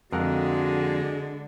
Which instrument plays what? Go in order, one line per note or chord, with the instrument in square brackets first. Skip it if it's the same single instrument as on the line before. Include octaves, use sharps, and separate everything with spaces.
[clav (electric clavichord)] F2 A#4 F#5 [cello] D3 [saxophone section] G#3 [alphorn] F#4